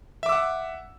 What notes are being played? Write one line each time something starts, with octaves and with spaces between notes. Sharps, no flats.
E5 F#5 D6 E6